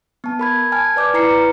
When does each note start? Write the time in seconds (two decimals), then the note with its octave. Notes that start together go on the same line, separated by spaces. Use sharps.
0.24 B3 A5
0.39 A#4 B5 G#6
0.72 G#5 A5 F6 G#6
0.96 B4 D5 D6 F6 G6
1.14 E4 B4 A#5 C7 C#7